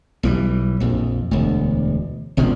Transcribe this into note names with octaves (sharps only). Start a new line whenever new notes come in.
B1 E3 G3
A#1 F2
E1 D2
G#1 B2 D#3 F3